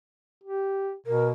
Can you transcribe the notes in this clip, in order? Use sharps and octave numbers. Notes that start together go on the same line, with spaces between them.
G4
B2 A#4